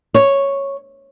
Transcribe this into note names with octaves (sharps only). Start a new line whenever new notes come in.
C#5